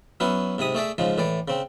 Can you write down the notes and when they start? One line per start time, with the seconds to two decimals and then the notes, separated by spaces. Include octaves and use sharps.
0.20 F#3 B3 C#4 E4 F#4
0.58 G#2 C3 B5 D#6
0.75 A3 G#4 D5 E5
0.98 G#2 C#3 F3 G#3
1.18 A2 E3 D5
1.48 C#3 C4